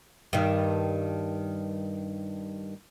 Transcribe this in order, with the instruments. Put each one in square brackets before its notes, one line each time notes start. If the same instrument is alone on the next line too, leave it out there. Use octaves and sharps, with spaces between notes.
[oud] G2 D#3